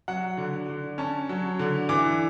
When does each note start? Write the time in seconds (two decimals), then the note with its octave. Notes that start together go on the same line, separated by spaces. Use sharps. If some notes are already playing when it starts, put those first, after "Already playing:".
0.08 F#3 F#5
0.37 D3
0.69 D3
0.98 C#4 A5
1.29 F#3
1.59 D3
1.89 E3 D6